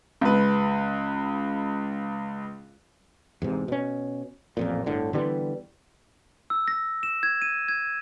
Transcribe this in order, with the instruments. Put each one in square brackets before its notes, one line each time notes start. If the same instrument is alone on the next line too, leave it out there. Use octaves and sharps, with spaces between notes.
[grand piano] C#2 B4
[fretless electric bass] E2 G#2 C3
B2 C#4
A1 F2 A#2
G1 A2 D3
D3 E3 G3 B3
[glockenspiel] E6
A#6
E7
G#6
D#7
G#6